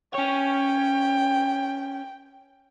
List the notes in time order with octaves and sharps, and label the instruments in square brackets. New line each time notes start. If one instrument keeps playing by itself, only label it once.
[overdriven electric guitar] C#4 C#5 [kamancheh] G5